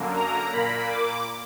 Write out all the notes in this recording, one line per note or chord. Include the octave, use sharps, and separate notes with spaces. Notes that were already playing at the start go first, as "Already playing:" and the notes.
Already playing: F#2 D3 A#3
A#5
A#2 A#3 B5
D6